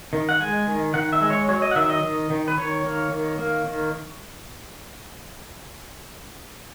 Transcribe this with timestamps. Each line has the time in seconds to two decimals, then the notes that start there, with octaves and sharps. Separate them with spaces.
0.13 D#3
0.29 F#5
0.40 G#3 G#5
0.67 D#3
0.94 D#3 F#5
1.13 E5
1.21 G#3
1.30 C#5
1.48 F#3 C#5
1.62 D#5
1.71 F#5
1.76 D#3 E5
1.90 D#5
2.03 D#3
2.30 D#3
2.48 B4
2.57 D#3 C#5
2.84 A#3
3.12 D#3
3.39 A#3
3.66 D#3